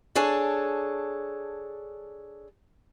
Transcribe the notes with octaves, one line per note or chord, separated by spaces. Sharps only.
D4 G#4 A4 C#5